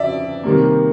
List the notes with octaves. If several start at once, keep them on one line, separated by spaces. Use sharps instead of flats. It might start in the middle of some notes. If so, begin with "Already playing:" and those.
Already playing: F2 C#3 F3 D5 E5
C3 D#3 G3 A#3